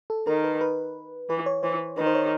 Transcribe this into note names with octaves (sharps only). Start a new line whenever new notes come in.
A4
D#3 A#4
B4
B4
E3 B4
C#5
E3 C5
D#3 B4
C5
C#5